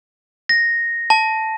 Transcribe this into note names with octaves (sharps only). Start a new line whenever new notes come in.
A#6
A5